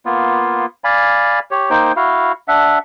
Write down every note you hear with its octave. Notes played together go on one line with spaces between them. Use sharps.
A#3 B3 F4
D5 F5 G#5 B5
G4 C#5
A#3 D#4 C5 G5
E4 F#4 F5
D4 E5 F#5